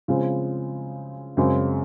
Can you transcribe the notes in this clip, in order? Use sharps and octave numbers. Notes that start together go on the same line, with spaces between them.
C#3 F3 G#3 C4
F#2 C#3 G#3 C4